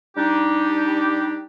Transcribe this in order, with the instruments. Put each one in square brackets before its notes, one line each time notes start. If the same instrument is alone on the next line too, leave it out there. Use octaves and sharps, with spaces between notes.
[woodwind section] G3 D4 D#4 G4